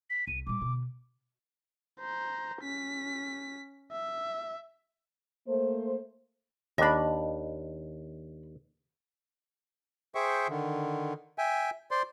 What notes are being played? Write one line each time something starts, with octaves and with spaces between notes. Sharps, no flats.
B6
C2 D#7
A#2 G3 D6
B2 D3
C5 A#5
C#4 B6
E5
A3 A#3 C5
D#2 D4 D#5 B5
G#4 C5 E5 G5 C#6
D3 D#3
E5 G5 G#5
C5 D5 C6